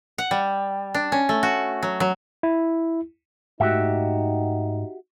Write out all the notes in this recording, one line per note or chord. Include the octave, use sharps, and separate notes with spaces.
F#5
G3
D4
C#4
A3
F#4
F#3
F#3
E4
G#2 A3 D#4 F#4 G4 E5